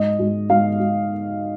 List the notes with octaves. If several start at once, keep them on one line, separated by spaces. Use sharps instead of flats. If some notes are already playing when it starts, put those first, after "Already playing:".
Already playing: G#2 D#5
G#2
G#2 F5
G#2